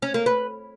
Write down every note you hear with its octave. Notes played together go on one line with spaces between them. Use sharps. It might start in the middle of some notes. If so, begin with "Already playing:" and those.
C#4
A#3
B4